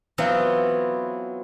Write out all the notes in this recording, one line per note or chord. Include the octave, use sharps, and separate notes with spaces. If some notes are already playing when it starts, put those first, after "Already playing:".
E3 F#3 B3 C4 E4 F4